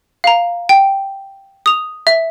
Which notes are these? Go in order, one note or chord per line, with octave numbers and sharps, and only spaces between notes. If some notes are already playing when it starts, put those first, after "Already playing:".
F5 A#5
G5
D#6 F7
E5